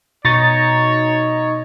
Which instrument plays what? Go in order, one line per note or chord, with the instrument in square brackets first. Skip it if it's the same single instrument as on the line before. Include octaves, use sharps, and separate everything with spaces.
[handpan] B2 [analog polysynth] D#4 [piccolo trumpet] C#5 [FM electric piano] C#6 A6 A#6